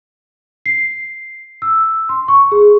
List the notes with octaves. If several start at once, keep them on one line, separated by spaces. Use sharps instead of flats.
C7
E6
C6
C#6
G#4